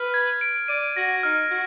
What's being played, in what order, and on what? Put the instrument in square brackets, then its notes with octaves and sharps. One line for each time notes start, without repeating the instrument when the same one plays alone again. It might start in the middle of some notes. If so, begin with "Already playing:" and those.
Already playing: [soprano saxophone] B4 [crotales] F6
[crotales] G#6
D7
[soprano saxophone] D5 [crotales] D#7
[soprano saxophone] F#4 [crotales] A#6
[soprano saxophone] D#4 [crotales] F6
[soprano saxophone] F#4